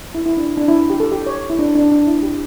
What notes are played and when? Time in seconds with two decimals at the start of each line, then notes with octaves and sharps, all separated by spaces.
0.15 E4
0.26 E4
0.37 D4
0.57 D4
0.68 E4
0.90 G4
1.00 A4
1.12 G4
1.26 C#5
1.50 E4
1.59 D4
1.75 D4
1.92 D4
2.07 E4
2.23 G4